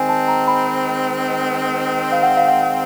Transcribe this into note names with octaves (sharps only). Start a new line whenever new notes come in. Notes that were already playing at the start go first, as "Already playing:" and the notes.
Already playing: D#3 G#3 C4 G#5
A5
A#5
B5
F5
F#5
F5
F#5